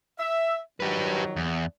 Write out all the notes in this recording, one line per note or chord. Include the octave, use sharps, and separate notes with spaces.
E5
D#3 F3 F#3 G4 B4
E2